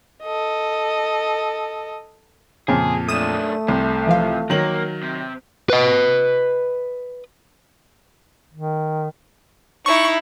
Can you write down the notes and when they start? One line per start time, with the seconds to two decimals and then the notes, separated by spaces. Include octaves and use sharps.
0.23 A4 D#5
2.68 F2 A#2 C#3 G#4
3.09 F#2 A3 D4 D#6 E7
3.68 C2 C3
4.07 E3 F3 F5
4.50 D#3 F#3 A#3 F#7
5.03 C3
5.70 B4 D#5
8.53 D#3
9.86 D#4 E4 C#6